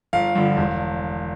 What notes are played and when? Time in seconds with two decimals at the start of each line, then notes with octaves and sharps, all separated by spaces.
0.13 G1 F5
0.35 G2 D3 F3
0.57 E1